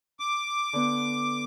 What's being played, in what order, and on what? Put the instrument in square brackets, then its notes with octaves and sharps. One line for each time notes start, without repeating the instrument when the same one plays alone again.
[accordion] D6
[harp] D3 B3